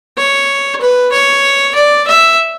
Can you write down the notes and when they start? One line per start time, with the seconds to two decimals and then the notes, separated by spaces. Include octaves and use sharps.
0.17 C#5
0.81 B4
1.13 C#5
1.76 D5
2.07 E5